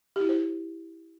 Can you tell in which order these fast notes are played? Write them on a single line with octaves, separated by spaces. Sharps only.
G4 E4 F#4 C5